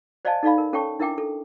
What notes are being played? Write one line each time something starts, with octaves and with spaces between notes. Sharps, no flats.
C5 D5 D#5 F5 G#5 A5
D#4 A4 D5 F5 B5
A#4
C#4 A4 C#5 G5 A5 C#6
D4 E4 A#4 E5 G5 D6
A4